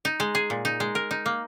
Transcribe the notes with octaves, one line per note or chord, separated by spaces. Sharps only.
D#4
G#3
G#4
A#2
D#4
G#3
A#4
D#4
A#3